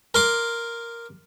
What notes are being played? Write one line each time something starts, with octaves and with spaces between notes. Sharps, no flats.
A#4 C6 D6